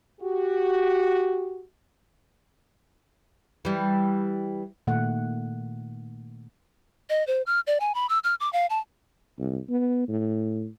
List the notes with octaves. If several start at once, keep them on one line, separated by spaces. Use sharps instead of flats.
F#4 G4
E3 G3
A#2 D#3 A3 F#5
D#5
C5
F6
D5
G#5
B5
E6
F6
D6
F5
A5
C2
B3
A2